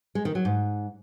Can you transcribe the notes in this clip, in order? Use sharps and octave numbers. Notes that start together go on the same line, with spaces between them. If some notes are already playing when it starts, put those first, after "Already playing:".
G#3
D#3
F#3
G#2